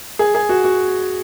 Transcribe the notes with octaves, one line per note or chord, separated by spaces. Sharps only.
G#4
G#4
F#4
F#4